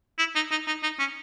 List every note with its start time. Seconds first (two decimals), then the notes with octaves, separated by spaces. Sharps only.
0.19 E4
0.35 D#4
0.51 D#4
0.67 D#4
0.83 D#4
0.99 C#4